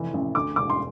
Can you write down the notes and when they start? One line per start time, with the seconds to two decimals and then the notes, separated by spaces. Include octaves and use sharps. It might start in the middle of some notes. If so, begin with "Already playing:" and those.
Already playing: F1 E3
0.14 A1
0.35 D2 D6
0.56 E1 D6
0.70 C6